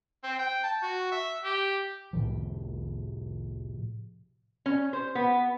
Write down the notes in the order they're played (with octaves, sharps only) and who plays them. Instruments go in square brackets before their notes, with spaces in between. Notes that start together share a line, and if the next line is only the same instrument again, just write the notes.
[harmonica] C4
G5
A5
F#4
E5
G4
[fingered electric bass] A2 C3 F3
[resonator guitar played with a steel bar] C#4
C5
B3